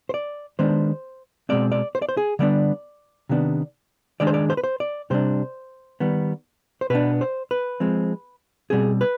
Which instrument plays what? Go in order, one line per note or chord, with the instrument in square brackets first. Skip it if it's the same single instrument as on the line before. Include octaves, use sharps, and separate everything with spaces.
[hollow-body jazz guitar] C5
D5
D#3 G#3 B3 D4 C5
B2 G#3 C4 D5
D5
C5
D5
C5
G#4
D3 G3 B3 D4 D5
C3 D#3 B3 D4
D#3 G#3 D4 D5
C5
D5
C5
B4
C5
D5
C3 G3 D4 C5
D#3 G3 B3
C5
B2 B3 D4 B4
C5
B4
F3 G#3 C4
B2 G3 C4 G#4
B4